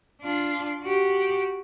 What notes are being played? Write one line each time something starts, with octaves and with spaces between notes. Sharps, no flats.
D4 F4
F#4 G4